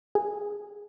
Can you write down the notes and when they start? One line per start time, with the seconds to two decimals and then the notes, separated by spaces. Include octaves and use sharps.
0.15 G#4